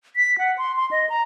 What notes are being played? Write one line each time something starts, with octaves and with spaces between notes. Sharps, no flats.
B6
F#5
C6
C6
D#5
A#5